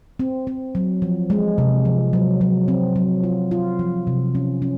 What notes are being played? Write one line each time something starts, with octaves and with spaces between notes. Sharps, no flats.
C4
C4
F#3
F3
G#3
C3
F3
F#3
F#3
C4
F#3
F4
F4
F3
C3
C#4
C#4